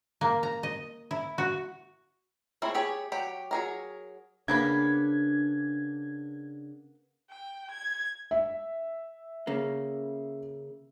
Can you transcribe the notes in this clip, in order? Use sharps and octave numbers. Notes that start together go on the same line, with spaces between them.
A#3
A#5
D#5
E4
F#4
A3 C4 E4 G#4 C#5
G4 G#4 C#5 G5
F#3 G4 G5
F#3 G#4 A#4
C#3 A#3 B3 D4 B4 G#5 G#6
G5
G#6
E5
C#3 A#3